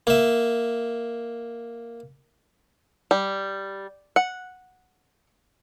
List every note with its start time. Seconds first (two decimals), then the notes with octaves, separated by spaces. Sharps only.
0.07 A#3 E5
3.11 G3
4.16 F#5